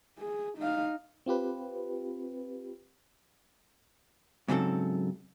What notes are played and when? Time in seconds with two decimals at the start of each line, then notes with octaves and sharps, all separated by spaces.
0.20 G#4
0.59 D#4 F5
1.26 C4 F4 G4 B4
4.48 G#2 C#3 F#3 C4 A4